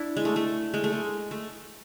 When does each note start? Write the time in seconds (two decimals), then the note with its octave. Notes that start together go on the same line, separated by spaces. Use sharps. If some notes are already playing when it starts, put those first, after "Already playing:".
Already playing: D4 E4
0.17 G#3
0.25 A3
0.36 A3
0.74 G#3
0.84 A3
0.93 G#3
1.31 A3